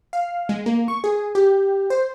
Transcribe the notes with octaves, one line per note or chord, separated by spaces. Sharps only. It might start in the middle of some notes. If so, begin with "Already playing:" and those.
F5
G#3
A#3
C#6
G#4
G4
C5